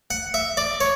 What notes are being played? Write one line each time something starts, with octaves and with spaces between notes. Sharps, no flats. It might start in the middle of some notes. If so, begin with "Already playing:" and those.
F#5
E5
D5
C#5